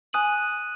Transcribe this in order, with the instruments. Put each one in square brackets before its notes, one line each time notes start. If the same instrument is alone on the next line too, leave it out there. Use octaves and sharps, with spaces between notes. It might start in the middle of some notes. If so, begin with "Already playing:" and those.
[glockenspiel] G#5 D#6 F#6 D#7 F#7